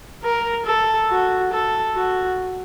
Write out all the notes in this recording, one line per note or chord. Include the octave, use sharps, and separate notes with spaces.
A#4
A4
F#4
A4
F#4